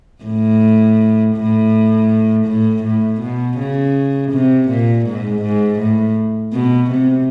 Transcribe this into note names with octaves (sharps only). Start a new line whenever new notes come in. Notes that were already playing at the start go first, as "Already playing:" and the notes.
A2
A2
A2
A2
B2
C#3
C3
A#2
G#2
G#2
A2
B2
C3